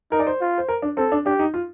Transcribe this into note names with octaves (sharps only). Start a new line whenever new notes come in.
D#4 A#4
D5
C5
F4
C5
A#4
D4
C4 A4
D4
D4 G4
D#4
F4